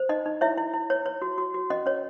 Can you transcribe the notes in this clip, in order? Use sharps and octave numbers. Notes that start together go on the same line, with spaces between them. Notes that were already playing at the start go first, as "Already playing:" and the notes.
Already playing: C5
D#4 D#5
D#4
E4 C#5 E5
E4
E4
C#5
C#5
F#4
F#4
F#4
C#4 D#5
C#4 C#5